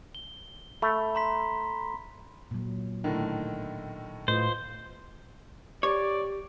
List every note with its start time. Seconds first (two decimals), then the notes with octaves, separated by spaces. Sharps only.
0.15 G7
0.82 A3 B5
1.15 A#5 C6 B6
2.51 A#2 F#3
3.04 A2 D3 D#3
4.28 A2 F4 B4 C5 D#5
5.83 G4 C#5 D5